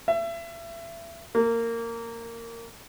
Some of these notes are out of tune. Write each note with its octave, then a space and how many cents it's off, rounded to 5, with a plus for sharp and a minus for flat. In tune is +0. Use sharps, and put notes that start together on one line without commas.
E5 +30
A#3 -15